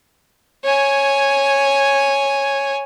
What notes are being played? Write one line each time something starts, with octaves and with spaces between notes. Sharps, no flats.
C#5 G#5